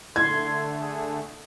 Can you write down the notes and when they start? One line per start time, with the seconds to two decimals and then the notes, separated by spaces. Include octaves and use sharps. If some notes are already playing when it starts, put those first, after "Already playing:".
0.16 D3 A3 C6 G#6
0.80 G#4